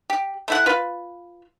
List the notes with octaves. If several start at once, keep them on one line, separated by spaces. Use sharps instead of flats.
G4
A3 E4 F#5
F4 B4